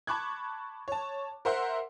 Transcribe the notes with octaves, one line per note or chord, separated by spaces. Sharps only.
A5 B5 C#6 D6 F#6 G#6
C#5 A5
A#4 C5 E5 F#5 C6